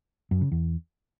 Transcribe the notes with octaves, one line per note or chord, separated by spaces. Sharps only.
F#2
C#3
E2